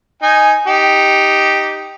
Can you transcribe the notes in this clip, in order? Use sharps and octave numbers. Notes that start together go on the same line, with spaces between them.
D#4 G#5
D#4 G4